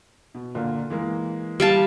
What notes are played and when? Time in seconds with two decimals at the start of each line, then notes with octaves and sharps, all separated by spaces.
0.34 B2
0.55 A#2 D3 A#3
0.90 E3 G#3 A#3
1.60 G3 F5 A5